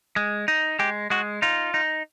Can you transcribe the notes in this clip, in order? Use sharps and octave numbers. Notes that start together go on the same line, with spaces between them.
G#3
D#4
G#3 G4
G#3 F#4
D#4 F4
D#4